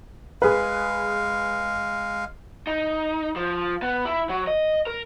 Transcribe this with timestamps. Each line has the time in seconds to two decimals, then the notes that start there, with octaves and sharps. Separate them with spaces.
0.42 G#3 G#4 B4 F5
2.67 D#4
3.36 F3
3.82 B3
4.05 E4
4.29 F#3
4.47 D#5
4.87 A#4